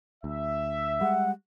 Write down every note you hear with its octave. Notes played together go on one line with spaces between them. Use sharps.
D2 E5
G3 G#3 F#5